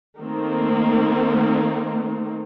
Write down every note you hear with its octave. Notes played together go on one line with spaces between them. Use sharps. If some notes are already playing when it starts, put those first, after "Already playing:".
D#3 A3 A#3 C4